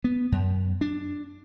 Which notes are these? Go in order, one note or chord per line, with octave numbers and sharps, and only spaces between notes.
B3
F#2
D4